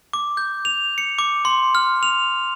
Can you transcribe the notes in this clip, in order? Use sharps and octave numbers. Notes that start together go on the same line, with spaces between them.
D6
G6
F7
C#7
D6
C6
F6
F7